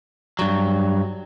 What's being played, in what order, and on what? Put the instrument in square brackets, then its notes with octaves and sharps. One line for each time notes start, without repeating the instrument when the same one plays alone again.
[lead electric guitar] G2 F#3